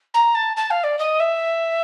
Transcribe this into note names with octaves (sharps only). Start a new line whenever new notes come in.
A#5
A5
A5
F5
D5
D#5
E5